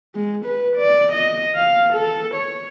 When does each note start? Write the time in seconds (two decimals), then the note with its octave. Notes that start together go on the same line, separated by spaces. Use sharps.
0.15 G#3
0.45 B4
0.76 D5
1.13 D#5
1.55 F5
1.93 A4
2.34 C#5